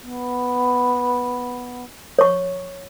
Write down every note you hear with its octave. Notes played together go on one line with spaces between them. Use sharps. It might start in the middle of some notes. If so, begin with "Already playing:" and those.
B3
C#5 C#6